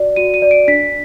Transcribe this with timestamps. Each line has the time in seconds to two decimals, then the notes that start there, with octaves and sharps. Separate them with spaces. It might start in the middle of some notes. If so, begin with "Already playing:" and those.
Already playing: F#4 D5
0.16 F#4 D#7
0.34 D#7
0.42 D5
0.51 D7
0.68 D4 B6